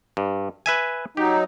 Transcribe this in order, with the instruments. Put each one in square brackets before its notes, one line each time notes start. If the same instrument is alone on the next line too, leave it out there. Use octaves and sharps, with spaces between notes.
[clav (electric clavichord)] G2
B4 E5 G#5
[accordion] F#3 D#4 [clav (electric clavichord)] G4